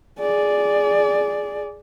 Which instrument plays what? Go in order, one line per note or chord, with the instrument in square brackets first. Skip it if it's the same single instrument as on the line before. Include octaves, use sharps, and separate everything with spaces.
[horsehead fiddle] G#4 D5